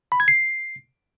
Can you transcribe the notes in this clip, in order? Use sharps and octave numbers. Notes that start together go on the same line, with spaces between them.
B5
G#6
C7